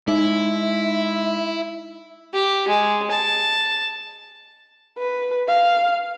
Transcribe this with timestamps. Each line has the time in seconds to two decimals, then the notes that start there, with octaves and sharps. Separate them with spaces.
0.08 G#3 D#4 E4 E5
2.33 G4
2.68 G#3
3.11 A5
4.98 B4
5.48 F5